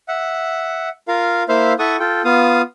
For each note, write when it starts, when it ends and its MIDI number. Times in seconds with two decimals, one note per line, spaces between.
0.08 0.89 76
0.08 0.89 78
1.08 1.43 65
1.08 1.43 70
1.08 1.43 77
1.48 1.73 58
1.48 1.73 64
1.48 1.73 72
1.48 1.73 76
1.48 1.73 77
1.79 1.96 64
1.79 1.96 69
1.79 1.96 78
1.79 1.96 85
1.79 1.96 87
2.00 2.22 65
2.00 2.22 69
2.00 2.22 79
2.25 2.62 59
2.25 2.62 65
2.25 2.62 77
2.25 2.62 87